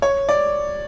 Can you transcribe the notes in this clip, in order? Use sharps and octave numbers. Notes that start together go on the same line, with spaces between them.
C#5
D5